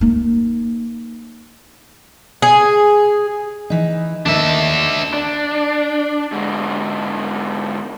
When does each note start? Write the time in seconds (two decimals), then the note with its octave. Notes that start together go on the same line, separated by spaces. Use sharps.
0.01 A#3 D#4
2.42 G#4
3.70 E3 D#4
4.26 D#2 D4 D#4 E5
5.14 D4
6.32 G#2 D3